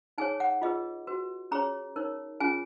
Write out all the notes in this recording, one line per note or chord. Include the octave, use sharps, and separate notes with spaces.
D#4 G#4 C#5 G#5
F#5
F4 G#4 B4 D#5
F#4 B4
C#4 G#4 C#5 A#5
D#4 A#4 C#5
C#4 F4 G#4 G#5